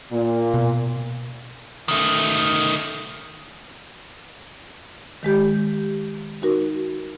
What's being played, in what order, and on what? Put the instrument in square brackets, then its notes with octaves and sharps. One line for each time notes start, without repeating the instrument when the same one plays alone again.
[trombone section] A#2
[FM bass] B2
[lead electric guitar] D#3 A3
[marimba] D#3 G#3 G4 G6
D#4 F#4 A#4